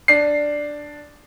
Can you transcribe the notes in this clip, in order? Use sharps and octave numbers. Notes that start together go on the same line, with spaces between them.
D4 C7